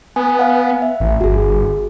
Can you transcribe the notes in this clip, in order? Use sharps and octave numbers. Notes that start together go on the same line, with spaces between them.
B3 G#5
F5 F#5 G#5
E5
A1
G1 F#4 G#4